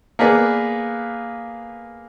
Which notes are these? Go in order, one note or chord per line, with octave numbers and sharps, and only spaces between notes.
A#3 B3 G#4 B4 D5